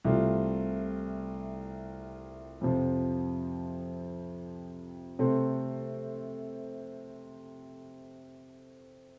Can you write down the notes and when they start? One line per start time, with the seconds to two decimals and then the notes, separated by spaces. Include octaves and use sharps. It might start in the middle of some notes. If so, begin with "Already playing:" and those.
0.04 C2 C3 A3 F4
2.61 F2 C3 F3
5.19 C3 A3 C4 A4 C5